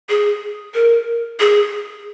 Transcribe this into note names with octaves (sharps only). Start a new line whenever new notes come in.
G#4
A#4
G#4